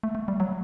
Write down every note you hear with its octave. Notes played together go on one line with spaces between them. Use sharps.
A3
A3
G3
F#3